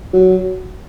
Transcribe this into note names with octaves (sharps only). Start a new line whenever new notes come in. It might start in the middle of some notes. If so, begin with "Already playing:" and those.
F#3